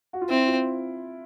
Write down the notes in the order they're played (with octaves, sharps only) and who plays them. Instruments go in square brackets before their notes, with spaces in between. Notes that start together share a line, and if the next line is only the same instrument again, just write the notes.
[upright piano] F#4
F4
[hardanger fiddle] C4 [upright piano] E4
[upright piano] F4